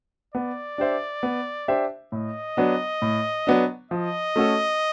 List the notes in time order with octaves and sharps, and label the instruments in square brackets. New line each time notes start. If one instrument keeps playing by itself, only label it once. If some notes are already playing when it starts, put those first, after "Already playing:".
[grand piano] B3 [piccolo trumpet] D5
[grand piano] D4 G4 C5 E5
B3
D4 G4 C5 E5
[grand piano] A2 [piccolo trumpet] D#5
[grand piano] F#3 B3 D4
A2
F#3 B3 D4
[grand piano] F3 [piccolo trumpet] D#5
[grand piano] A3 C#4 F#4 A4